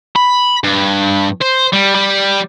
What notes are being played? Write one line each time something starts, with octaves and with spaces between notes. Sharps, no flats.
B5
G2
C5
G3
G3